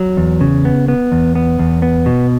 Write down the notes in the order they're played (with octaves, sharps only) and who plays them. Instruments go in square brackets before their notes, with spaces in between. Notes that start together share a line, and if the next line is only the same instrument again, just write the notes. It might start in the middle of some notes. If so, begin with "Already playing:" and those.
Already playing: [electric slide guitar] F#3
E2
C#3
B3
B3
E2
B3
E2
B3
B2